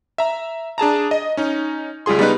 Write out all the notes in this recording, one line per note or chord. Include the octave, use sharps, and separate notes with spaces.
E5 A#5
D4 G#4 A5 A#5
D#5
C#4 D#4
C#2 G3 F4 G#4 C6
G3 B3 D#4 B4